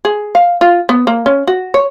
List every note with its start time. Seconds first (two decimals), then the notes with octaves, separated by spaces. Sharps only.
0.05 G#4
0.35 F5
0.61 F4
0.89 B3
1.07 A#3
1.26 C#4
1.47 F#4
1.74 C#5